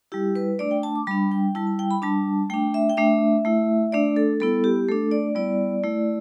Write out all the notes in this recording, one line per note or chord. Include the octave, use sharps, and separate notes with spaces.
G3 E4 G4
B4
A3 D4 D5
G5
A5
D6
G3 D4 B5
G5
G3 E4 A5
A5
G5
B5
G3 D4 A5
A3 D4 G5
E5
G5
A3 D4 E5
A3 E4
A3 D4 D5
A4
G3 B3 E4 A4
G4
A3 D4 A4
D5
G3 B3 E4 D5
A3 E4